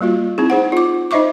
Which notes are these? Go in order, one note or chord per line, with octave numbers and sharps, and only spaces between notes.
G3 A#3 F4 F#4
C4 D#4 E4 G#4
D#4 G#4 C5 F#5
F4 D6
D#4 C5 D#5 E5 C#6 D6